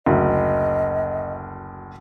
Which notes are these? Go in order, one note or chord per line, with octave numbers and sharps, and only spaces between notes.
F#1 D2 D#5